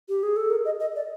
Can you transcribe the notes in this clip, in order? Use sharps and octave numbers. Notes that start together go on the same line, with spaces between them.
G4
G#4
A4
A#4
D#5
D#5
D5